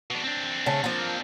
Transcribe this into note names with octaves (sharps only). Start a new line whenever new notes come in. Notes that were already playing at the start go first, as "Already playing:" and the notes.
B2 D4
C4 D4
C#3 A3
F3 A#3